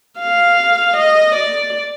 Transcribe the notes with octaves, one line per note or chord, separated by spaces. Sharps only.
F5
D#5
D5